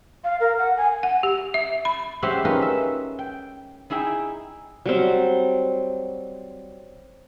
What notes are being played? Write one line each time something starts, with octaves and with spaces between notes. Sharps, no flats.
F5
A#4
F#5
G#5
F#5
G4
E5
B5
G#3 C#4 G4 C5 E5 F#5
C#4 D#4 F4 A#4 B4
E5
G5
D#4 E4 G#4 E5 G5
F#3 G3 C4